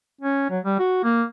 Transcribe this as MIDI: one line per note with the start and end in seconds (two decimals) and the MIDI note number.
0.21 0.49 61
0.50 0.59 54
0.64 0.76 55
0.79 1.00 66
1.03 1.23 58